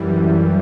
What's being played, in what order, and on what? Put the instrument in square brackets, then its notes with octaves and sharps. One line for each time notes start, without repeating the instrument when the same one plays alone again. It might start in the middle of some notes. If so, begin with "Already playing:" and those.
Already playing: [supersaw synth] F#2 E3 G3